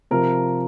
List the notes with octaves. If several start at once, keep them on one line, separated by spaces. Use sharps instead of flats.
C3 F3 A#4